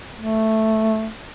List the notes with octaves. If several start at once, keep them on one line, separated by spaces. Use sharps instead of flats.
A3